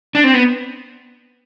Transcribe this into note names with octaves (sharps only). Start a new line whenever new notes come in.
D4
C4
B3